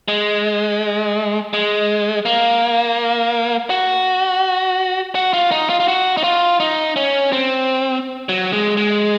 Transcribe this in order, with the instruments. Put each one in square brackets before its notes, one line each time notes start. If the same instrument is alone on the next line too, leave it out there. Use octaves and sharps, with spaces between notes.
[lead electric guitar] G#3
G#3
A#3
F#4
F#4
F4
D#4
F4
F4
F#4
D#4
F4
D#4
C#4
C4
F#3
G#3
G#3